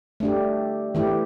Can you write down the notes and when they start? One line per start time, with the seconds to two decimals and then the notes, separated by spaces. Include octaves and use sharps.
0.20 A3 D4 G4
0.95 E3 A3 E4 G4